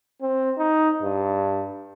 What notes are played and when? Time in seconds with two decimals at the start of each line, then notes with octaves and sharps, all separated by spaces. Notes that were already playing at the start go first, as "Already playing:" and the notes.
0.22 C4
0.58 D#4
1.03 G2